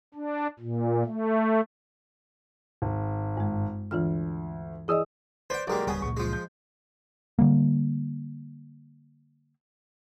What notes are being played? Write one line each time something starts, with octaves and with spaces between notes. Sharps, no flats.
D4
A#2
A3
G#1
G2 G#3
D2 E3 F4 F6
E3 G#4 D5 D#5 D#6 E6
B4 C5 D5 G5
B1 G#3 A#3 G4 A#4 D5
D1 C#3 G3 B3 G#4 G#5
C#2 A#2 C#6
F3 G#3
G6
D3 G3 A#3